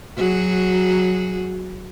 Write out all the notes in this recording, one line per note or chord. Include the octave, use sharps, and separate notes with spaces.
F#3 F#4 G#4